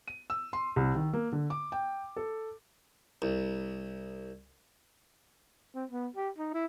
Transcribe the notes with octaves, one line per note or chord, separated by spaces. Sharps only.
D#7
E6
C6
C2
D#3
A#3
D3
D6
G5
A4
C2
C4
B3
G4
D#4
E4